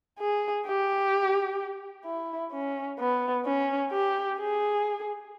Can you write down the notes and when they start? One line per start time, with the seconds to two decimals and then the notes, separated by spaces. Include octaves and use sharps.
0.19 G#4
0.66 G4
2.05 E4
2.53 C#4
2.99 B3
3.45 C#4
3.92 G4
4.39 G#4